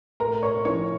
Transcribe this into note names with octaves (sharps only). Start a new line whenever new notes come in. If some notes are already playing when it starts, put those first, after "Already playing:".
A2 A#4 A#5
C#5 C#6
F3 C#4 E4 C#5 C#6